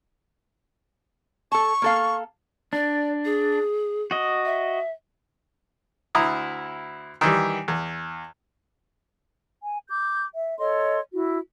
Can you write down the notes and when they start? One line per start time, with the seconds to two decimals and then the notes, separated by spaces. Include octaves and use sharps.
1.52 A4 A5 C#6
1.82 A#3 A4 F5
2.73 D4 D5
3.25 G#4
4.11 F#4 D#5
4.45 E5
6.15 D2 E4 A#5 D#6
7.21 D#3 E3 G3
7.68 E2
9.63 G#5
9.88 D6 G6
10.35 E5
10.58 A4 C#5 D#5 C6
11.12 E4 F#4